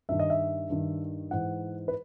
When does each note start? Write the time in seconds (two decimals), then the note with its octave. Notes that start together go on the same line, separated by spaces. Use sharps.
0.09 G2 D#3 E5
0.20 D#5
0.30 E5
0.70 G2 D#3
1.31 G#2 E3 F#5
1.88 B4